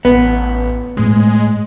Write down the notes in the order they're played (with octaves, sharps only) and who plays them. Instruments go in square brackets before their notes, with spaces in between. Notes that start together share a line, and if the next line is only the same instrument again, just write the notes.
[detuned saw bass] A1 [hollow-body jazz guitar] B3
[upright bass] A2 [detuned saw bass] G#3